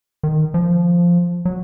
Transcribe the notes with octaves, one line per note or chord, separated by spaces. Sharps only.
D#3
F3
F#3